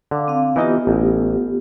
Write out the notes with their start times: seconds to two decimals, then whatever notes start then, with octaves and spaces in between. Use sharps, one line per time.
0.11 D3 F5 D6
0.28 C4 F5
0.56 E3 B3 D#4 F4 G4 D#5
0.87 A1